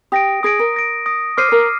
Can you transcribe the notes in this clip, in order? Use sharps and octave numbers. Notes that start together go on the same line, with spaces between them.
G4 D#6 A#6 D7
G#4 D#6 A#6 D7
A#4
D#6 A#6 D7
D#6 A#6 D7
C5 D6 F6 C7 D#7
A#4